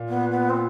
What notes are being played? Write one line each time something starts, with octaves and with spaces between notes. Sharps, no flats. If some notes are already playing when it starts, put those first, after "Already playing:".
Already playing: A#2
B3
B3
C4